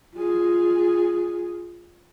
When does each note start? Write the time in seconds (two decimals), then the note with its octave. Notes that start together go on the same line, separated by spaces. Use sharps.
0.15 F4 G#4